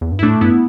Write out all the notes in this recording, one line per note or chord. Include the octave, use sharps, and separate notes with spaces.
E2
G2
E4
A2 A3 D4
G2 B3 E4